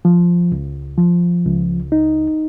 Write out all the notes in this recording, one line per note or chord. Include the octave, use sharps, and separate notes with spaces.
F3
C#2
F3
C#2
D#4